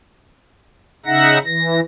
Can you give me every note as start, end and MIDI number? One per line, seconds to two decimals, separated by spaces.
1.06 1.38 49
1.06 1.38 63
1.06 1.38 76
1.06 1.38 78
1.06 1.38 94
1.45 1.80 52
1.45 1.80 94